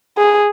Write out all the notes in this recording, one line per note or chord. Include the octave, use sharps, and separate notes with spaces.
G#4